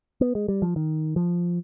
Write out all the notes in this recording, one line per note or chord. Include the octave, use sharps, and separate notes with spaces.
B3
G#3
G3
F3
D#3
F3